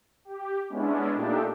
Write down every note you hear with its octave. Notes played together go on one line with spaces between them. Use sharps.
G4
G#3 B3 C#4 D4 E4
A#2 A3 D4 D#4 G4 A4